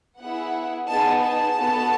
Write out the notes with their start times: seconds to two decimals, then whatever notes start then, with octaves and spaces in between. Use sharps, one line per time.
0.20 B3 E4 G#4 F#5
0.88 B3 D#4 G#4 A5
1.23 A5
1.58 B3 F#4 A4